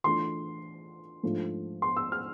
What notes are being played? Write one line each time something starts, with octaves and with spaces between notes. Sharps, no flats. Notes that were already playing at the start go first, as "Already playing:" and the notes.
E3 A3 D4 F4 C6
G#2 F3 A3 D4 F4
C6
E6
F6